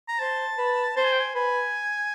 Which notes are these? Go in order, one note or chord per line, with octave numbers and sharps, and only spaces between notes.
A#5
C5 A5
B4
C5 A5
G#5
G5
G#5
B4 G#5